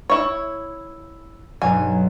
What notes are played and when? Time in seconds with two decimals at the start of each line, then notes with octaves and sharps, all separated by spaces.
0.10 E4 C#5
1.62 B1 G2 F#3 G#5